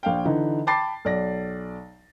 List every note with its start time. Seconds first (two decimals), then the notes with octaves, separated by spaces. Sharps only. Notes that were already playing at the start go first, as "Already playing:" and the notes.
0.03 A#1 F5 G5
0.25 D3 E3 D#4
0.67 G5 A5 B5 D6 A6 C7
1.05 B1 D5 A#6